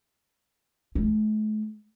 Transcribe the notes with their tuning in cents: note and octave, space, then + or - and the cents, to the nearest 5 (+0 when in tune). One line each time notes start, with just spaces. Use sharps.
A3 -45